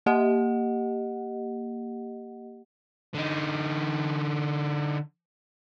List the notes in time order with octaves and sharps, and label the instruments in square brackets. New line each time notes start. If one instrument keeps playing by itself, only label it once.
[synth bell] A#3 G4 D#5 F#5
[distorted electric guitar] D3 D#4